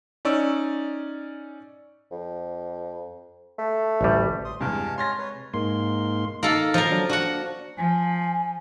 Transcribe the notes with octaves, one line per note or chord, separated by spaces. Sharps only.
C#4 D#4 D5 C#6 E6
F2
A3
A1 D2 G3
C6 D#6
E2 G2 C3 G#3 F5 G#5 A5
C#5 G#5 C6 F6 A6 A#6
B4 C#5
G#2 A#3 C6
A#3 D#4 A4 F5
F3 A#4
F#3 D4
D4 F#4 F#5
F3 G#5